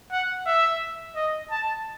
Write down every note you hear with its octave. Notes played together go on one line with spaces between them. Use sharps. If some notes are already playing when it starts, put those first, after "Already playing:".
F#5
E5
D#5
A5